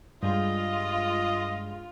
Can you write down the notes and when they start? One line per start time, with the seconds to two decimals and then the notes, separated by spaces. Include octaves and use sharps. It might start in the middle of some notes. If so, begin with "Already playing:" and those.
0.23 G2 G#3 F4 D#5